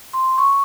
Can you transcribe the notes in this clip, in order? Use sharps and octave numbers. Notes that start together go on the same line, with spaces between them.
C6
C#6